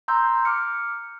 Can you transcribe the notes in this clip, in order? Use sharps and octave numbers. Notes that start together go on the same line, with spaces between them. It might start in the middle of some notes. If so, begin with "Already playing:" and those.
A#5 C6 E6 G6
D6 F6 C#7